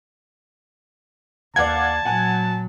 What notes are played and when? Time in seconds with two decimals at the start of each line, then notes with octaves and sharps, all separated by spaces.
1.56 D#2 D5 F5 F#5 A5 G#6
2.05 A#2 F#3 F#5 G#5